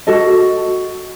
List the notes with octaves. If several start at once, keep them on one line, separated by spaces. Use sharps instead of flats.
F#4 A4 D#5